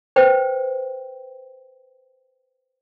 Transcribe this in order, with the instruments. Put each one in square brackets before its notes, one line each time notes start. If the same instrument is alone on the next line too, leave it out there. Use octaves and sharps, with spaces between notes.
[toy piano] B4 C5 G5